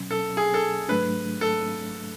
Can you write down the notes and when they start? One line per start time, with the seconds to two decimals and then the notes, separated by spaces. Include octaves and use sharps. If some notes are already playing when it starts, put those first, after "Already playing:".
Already playing: B2 F#3 C#4
0.11 A4
0.37 G#4
0.54 A4
0.89 G#2 F#3 A3 D4 B4
1.41 A4